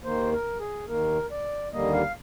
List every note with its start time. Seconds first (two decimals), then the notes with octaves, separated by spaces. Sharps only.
0.04 D#2 D#3 A#3 C5
0.33 A#4
0.60 G#4
0.88 D#2 D#3 A#3 A#4
1.31 D5
1.73 D#2 D3 G3 A#3 D#5
1.93 F5